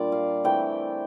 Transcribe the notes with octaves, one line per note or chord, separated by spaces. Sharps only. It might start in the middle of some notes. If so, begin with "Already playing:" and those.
Already playing: A#2 G3 D4 F4 D5
F5
E3 A3 C4 E4 G5